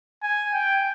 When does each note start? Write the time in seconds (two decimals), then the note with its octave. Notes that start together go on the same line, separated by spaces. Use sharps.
0.23 G#5
0.54 G5